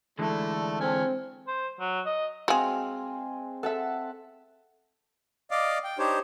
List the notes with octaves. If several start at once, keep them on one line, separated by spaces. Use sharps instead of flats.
D3 E3 G#3 A3 A4 D5 A5
C4 G#5 F6
C5
F#3
D#5
G#3 C4 F#4 G#4 F5
A4 E5 F#5 A5
D5 D#5 F5 D6
G5
D4 D#4 G4 C5 C#5